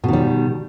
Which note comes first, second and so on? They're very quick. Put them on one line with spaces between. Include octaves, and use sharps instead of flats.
B2 D#3 G3